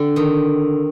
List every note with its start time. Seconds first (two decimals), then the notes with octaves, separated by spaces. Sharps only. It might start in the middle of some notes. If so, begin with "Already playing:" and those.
Already playing: D3 C4
0.16 D#3